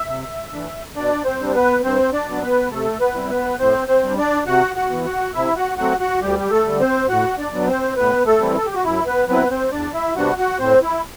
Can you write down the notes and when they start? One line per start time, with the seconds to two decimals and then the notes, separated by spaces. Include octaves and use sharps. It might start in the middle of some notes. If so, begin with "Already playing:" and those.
Already playing: E5
0.09 C3
0.52 E3 A3 D4
0.96 B2 D4 D5
1.25 C4 C5
1.40 G3 D4
1.55 B3 B4
1.83 G2 C4 C5
2.13 D4 D5
2.28 F#3 B3 D4
2.42 B3 B4
2.71 C3 A3 A4
3.01 B3 B4
3.15 G3 C4 E4
3.30 B3 B4
3.59 A2 C4 C5
3.88 C4 C5
4.03 G3 D4
4.17 D4 D5
4.46 C3 F#4 F#5
4.76 F#4 F#5
4.90 E3 B3
5.05 F#4 F#5
5.34 C3 E4 E5
5.56 F#4 F#5
5.78 F#3 A3 C4 F#4 F#5
6.00 F#4 F#5
6.21 D2 G3 G4
6.39 G4
6.51 A3 A4
6.66 D3 G3
6.80 C4 C5
7.09 A2 F#4 F#5
7.39 D4 D5
7.53 F#3 B3 D4
7.68 C4 C5
7.97 A2 B3 B4
8.26 A3 A4
8.40 E3 G3 C4 E4
8.57 A4
8.66 G4
8.75 F#4
8.84 F#2 E4
9.06 B3 B4
9.28 F#3 B3 C4 E4 B4
9.50 C4 C5
9.72 E2 D4 D5
9.93 E4 E5
10.16 C3 G3 B3 D4 F#4 F#5
10.38 F#4 F#5
10.59 A2 C4 C5
10.82 E4